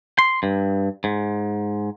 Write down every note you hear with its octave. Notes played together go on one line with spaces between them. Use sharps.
C6
G2
G#2